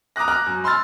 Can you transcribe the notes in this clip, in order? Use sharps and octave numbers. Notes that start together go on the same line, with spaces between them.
A#5 D6 D#6 F#6 A#6
A#5 D6 F6 F#6
F#2
B5 C6 E6 F6 A6